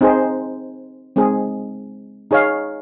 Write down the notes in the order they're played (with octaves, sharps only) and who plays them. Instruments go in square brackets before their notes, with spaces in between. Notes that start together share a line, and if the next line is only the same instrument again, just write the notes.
[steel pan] C4 D#4 G#4 C5
G#3 C4 D#4 G#4
D#4 G#4 C#5 F5